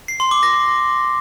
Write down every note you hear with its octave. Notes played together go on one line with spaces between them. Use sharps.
C7
C6
D6
A#6